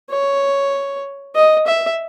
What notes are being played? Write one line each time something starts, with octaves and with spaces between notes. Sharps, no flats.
C#5
D#5
E5